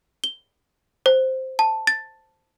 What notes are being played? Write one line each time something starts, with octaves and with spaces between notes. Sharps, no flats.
G7
C5
A5
A6